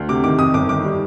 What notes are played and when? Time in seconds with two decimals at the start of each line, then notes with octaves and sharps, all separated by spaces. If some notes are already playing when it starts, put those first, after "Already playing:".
Already playing: D2
0.09 C3 D6
0.24 D#3 D6
0.39 F2 D#6
0.54 G1 D6
0.69 D#3 D6
0.84 G3